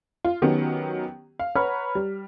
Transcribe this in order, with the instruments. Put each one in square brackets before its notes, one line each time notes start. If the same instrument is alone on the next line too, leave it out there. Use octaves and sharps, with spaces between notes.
[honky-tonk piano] F4
D#3 F#3 B3 C#4 G4
F5
B4 C#5 F#5 A#5 F6
G3